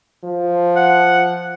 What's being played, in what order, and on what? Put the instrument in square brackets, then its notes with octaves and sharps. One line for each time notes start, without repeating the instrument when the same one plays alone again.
[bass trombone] F3
[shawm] F#5